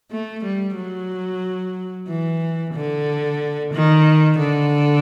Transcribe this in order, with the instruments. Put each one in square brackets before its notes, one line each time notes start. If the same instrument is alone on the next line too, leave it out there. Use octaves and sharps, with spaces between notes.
[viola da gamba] A3
G3
F#3
E3
D3
D#3
D3